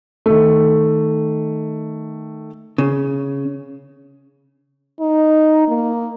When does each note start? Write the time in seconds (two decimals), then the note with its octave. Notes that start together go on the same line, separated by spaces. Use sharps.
0.26 D#3 A3
2.78 C#3
5.00 D#4
5.68 A#3